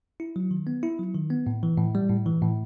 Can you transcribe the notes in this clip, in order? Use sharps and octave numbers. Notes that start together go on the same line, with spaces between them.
E4
F#3
D#3
B3
E4
F#3
D#3
B3
A2
E3
A2
G3
A2
E3
A2